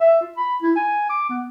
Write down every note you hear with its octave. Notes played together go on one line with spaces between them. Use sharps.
E5
F4
B5
E4
G#5
D6
B3